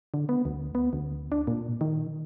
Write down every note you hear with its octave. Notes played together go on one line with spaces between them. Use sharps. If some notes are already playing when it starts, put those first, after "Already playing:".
D3
B3
D2
B3
D2
D4
A#2
D#3